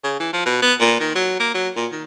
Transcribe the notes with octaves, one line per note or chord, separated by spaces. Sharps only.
C#3
E3
F3
B2
B3
A#2
D#3
F#3
A#3
F#3
A#2
D#3